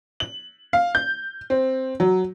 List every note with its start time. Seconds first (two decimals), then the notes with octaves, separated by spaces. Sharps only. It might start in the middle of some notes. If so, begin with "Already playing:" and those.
0.20 F#7
0.73 F5
0.95 G6
1.50 C4
2.00 F#3